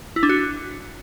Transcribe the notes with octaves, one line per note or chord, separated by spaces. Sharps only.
E4
D4
F#4